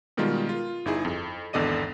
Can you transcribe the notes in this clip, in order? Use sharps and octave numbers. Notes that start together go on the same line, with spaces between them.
B2 D#3 G3 G#3 F4 A#4
F4
G1 D#4 E4 G#4
F2
G#1 E2 D3 D5 D#5 D#7